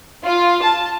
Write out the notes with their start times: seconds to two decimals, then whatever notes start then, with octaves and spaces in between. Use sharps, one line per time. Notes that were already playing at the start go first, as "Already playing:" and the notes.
0.25 F4
0.63 A5